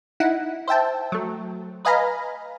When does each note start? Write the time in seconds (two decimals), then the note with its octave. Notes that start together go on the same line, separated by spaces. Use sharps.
0.20 D#4 E4 F#5
0.68 C5 E5 G5 A5
1.12 F#3 A3
1.85 B4 D#5 F5 G#5 A#5 B5